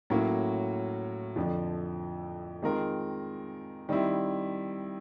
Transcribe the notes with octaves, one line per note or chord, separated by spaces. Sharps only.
A2 F#3 A#3 C#4
F2 D3 F3
D#3 G#3 C4 F4 A#4
D#3 G3 C4 E4